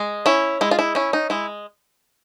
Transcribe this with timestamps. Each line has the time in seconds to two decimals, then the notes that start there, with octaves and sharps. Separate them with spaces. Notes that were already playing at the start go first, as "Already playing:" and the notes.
Already playing: G#3
0.26 C#4 E4
0.61 G#3 E4
0.71 F4
0.79 E4
0.95 C#4 E4
1.13 D#4
1.30 G#3 E4